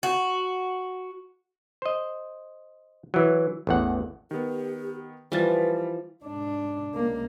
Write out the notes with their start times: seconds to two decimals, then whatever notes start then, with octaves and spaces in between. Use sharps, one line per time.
0.03 F#4
1.82 C5 D#5
3.14 E3 F#3
3.67 A1 E2 F#5
4.31 D#3 B3 G4
5.32 E3 F3 G3 B4 A6
6.23 G#2 D4
6.92 C#2 A#3